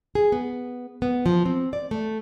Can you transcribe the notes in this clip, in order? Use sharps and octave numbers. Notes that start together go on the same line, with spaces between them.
G#4
B3
B3
F3
C4
D5
A3